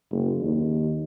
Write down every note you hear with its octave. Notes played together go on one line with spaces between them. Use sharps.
F#1
D#2